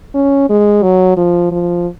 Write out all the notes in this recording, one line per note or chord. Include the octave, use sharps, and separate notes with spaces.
C#4
G#3
F#3
F3
F3